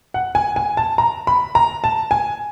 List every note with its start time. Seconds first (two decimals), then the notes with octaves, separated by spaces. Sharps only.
0.14 F#5
0.35 G#5
0.56 G#5
0.77 A5
0.98 A#5
1.27 B5
1.55 A#5
1.84 A5
2.11 G#5